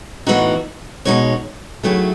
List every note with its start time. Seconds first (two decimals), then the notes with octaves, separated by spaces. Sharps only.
0.27 A2 E3 B3 D#4 F#4
1.05 B2 G#3 D#4 F#4 C#5
1.83 D#3 F#3 A3 E4 G#4